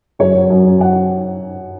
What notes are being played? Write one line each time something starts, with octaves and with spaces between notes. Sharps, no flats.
F#2 C#5
F#3
F#2
C#4
F#5